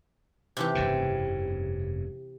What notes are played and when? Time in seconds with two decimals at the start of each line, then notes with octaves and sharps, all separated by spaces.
0.57 C3 E3 G4
0.75 F1 G2 C#3